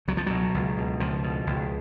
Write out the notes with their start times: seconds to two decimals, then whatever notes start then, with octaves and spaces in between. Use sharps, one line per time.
0.08 C#2 F#3
0.17 F3
0.27 B2 F#3
0.54 C#2
0.77 B2
1.00 C#2 F3
1.23 B2
1.47 C#2